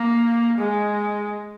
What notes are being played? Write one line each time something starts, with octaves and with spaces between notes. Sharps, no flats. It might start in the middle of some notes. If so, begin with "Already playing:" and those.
Already playing: A#3
G#3